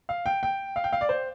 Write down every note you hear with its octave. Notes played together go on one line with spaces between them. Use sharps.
F5
G5
G5
F5
G5
F5
D5
C5